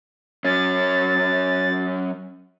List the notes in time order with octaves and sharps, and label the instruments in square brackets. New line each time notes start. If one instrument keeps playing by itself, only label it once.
[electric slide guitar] F#3 C#4 [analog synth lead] A6